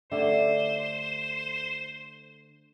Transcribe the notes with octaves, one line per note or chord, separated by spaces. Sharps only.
D3 A3 G4 C5